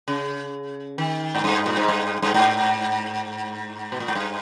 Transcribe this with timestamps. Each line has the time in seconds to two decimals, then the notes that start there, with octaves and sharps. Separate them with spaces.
0.08 C#3
0.98 D#3
1.35 G#2
1.44 G2
1.66 A#2
1.77 G#2
1.88 G2
2.22 G2
2.34 G#2
3.92 B2
4.00 A#2
4.08 G#2
4.15 G2